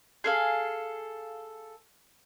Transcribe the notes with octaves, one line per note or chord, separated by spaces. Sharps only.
G#4 A4 F5